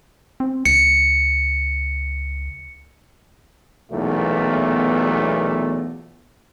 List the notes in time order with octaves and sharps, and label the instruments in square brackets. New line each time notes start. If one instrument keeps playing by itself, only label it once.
[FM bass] C4
[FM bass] C#2 [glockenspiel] C#7
[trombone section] B1 E2 A#2 A3